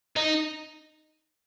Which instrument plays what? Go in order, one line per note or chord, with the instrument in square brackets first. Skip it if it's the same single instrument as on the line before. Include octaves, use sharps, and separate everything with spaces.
[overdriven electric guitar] D#4